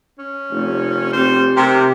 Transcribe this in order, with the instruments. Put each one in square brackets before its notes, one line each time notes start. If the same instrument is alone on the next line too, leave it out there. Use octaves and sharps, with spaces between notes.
[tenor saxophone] C#4
[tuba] F1
[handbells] C4 G4 [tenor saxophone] C5
[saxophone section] C3 [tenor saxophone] A#4